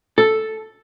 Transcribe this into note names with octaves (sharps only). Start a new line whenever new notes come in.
A4